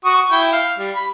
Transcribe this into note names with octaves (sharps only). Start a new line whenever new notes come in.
F#4 C#6 D#6
E4 G5
F5
G3
B5